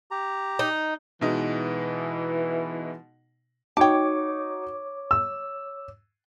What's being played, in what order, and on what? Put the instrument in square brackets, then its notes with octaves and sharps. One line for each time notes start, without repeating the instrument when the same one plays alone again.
[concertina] G4 A#5
[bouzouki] D#4
[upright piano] B2 G#3 D#4 [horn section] E3
[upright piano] D#4 F#4 [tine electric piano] C#5 D6 [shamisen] G5 A5
[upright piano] E6